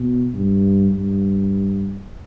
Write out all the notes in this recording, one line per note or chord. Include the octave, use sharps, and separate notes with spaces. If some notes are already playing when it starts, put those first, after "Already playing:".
Already playing: B2
G2
G2